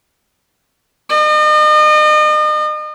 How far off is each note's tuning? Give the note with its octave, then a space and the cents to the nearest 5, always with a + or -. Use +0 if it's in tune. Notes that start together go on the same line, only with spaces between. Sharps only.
D#5 -40